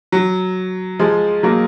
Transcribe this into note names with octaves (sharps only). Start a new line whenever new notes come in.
F#3
F3 G#3
F#3 A#3